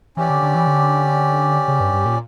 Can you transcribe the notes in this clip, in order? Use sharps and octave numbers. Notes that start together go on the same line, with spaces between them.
E3 C#4 G4 D5
D3
D3
E3
D3
C#3
G2
G2
A#2